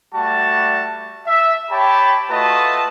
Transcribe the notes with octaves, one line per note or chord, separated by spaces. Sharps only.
G3 A3 F#4 A5
E5
G4 C#5 G5 A5 B5
A3 F4 F#4 B4 D#5 A5